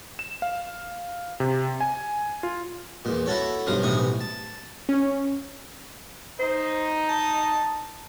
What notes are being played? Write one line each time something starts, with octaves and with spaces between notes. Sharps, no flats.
E7
F5
C3
G#5
F4
E2 A#2
E4 F#4 A4 C#5
B1 G2 F3 F#3 F5 D#6
B1 A2 C3 E3 C#6 D#6
A5
C#4
D#4 C5
A5